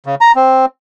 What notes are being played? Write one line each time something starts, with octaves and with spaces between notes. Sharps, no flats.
C#3
A#5
C4